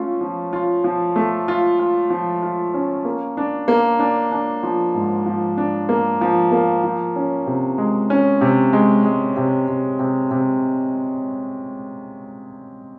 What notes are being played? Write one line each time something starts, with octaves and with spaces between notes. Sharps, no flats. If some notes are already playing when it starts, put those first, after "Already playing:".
Already playing: A3 C#4 F4
F3
F4
F3
A3
F4
F4
F3
F4
C#4
A#3
D4
A#3
D4
D4
F3
G#2
F3
D4
A#3
F3
A#3
F3
C#4
C3
G#3
C#4
C3
G#3
G#3
C3
C3
C3
C3